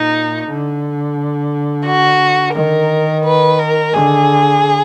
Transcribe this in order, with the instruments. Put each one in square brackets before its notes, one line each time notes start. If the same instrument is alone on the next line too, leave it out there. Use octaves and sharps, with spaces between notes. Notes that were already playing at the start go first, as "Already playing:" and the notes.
Already playing: [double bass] A#2 [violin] D#4
[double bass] D3
[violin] F#4
[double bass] D#3 [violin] A#4
[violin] B4
A#4
[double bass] D3 [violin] G#4